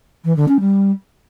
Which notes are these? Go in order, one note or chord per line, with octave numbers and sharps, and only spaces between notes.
E3
D3
C#4
G3